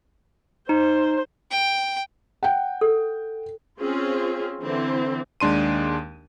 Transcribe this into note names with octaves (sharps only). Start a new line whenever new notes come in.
D#4 C5
G5
F#5 G5
A4
C4 C#4 F4 G#4
D3 E3 C4
D#2 G#3 D4 C6 D#7